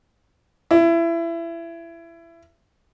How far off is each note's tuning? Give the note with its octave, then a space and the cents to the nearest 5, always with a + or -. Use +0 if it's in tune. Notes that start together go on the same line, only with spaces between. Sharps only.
E4 +25